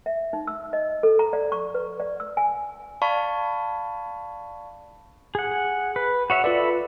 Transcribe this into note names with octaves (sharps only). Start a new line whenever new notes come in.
E5
D#4
E6
D#5
A4
A#5
D5
C#6
B4
D5
E6
G#5
D5 F5 A5 B5 C#6
G#4 F#5
B4
F#4 C#5 E5 F#5
F4 A4 B4 D5 E5 B5